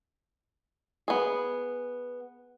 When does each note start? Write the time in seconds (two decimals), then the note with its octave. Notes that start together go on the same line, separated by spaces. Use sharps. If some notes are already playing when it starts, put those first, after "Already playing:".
1.08 B3 G#4